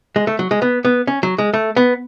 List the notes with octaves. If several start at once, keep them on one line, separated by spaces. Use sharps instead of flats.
G#3
A3
F#3
G#3
B3
B3
C#4
F#3
G#3
A3
B3